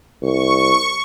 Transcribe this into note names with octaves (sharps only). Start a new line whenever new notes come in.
C2 C#6